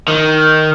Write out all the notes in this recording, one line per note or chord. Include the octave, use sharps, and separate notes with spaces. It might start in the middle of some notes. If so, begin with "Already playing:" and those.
D#3